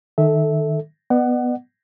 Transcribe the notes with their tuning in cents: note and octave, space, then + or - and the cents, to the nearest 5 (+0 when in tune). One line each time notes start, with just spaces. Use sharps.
D#3 -15 A4 +0 E5 -15
B3 +0 D5 +45 F#5 +15